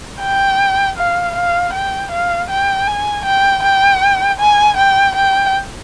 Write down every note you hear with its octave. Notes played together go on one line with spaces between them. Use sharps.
G5
F5
F5
G5
F5
G5
G#5
G5
G5
G#5
G5
G5